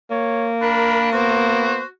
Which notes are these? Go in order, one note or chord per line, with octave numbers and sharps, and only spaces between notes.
A#3 C#5
D4 A#4 B5
B3 F#4 C5